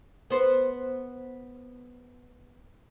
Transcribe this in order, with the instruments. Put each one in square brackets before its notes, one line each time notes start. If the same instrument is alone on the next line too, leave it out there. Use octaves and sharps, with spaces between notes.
[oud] B3 C5